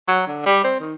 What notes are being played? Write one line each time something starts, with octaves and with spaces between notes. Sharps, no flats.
F#3
D3
G3
C4
D#3